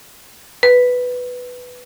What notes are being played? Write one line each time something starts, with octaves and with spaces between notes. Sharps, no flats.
B4